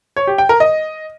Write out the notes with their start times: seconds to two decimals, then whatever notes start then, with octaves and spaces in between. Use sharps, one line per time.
0.16 C#5
0.27 G4
0.38 G5
0.49 A#4
0.60 D#5